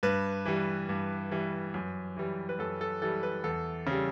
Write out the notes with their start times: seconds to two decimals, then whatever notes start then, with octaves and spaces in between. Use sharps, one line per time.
0.03 G2 B4
0.45 E3 G3
0.89 G2
1.31 E3 G3
1.74 F#2
2.17 E3 G3
2.49 B4
2.59 F#2 A4
2.81 A4
3.02 E3 G3 A4
3.23 B4
3.44 E2 A4
3.87 C#3 G3